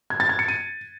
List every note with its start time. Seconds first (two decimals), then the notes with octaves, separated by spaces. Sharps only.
0.10 G#6
0.20 A6
0.29 G#6
0.39 C#7
0.48 D#7